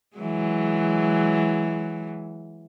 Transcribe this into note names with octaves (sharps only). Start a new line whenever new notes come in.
E3 F#3 G#3